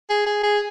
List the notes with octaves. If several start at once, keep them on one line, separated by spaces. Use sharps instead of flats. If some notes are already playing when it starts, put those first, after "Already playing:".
G#4
G#4
G#4